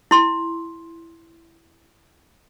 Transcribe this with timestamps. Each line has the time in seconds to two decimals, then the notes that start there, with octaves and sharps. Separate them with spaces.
0.11 E4 C6